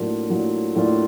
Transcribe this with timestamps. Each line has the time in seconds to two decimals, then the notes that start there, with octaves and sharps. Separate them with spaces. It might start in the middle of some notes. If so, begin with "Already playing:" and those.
Already playing: A2 F#3 A#3 D4 F4
0.30 A2 F#3 A#3 D4 F4
0.75 A2 F#3 A#3 D4 F4